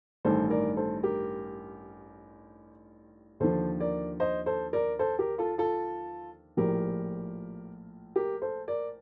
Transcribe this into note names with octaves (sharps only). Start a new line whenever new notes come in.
A1 G2 D#3 A4 C5
A#4 D5
A4 C5
G4 A#4
D#2 D3 F3 A4 C5
A#4 D5
C5 D#5
A4 C5
A#4 D5
A4 C5
G4 A#4
F4 A4
F4 A4
A#1 A2 F3 G4 A#4
G4 A#4
A4 C5
A#4 D5